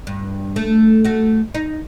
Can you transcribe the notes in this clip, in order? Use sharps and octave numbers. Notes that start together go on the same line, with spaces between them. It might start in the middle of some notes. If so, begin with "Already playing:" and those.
G2
A3
A3 F#4
D#4